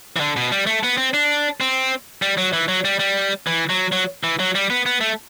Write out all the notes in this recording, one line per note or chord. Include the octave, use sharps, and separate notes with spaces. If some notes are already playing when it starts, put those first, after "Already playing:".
E3
D3
B2
G3
A3
B3
C4
D4
C4
G3
F#3
E3
F#3
G3
G3
E3
F#3
F#3
E3
F#3
G3
B3
B3
A3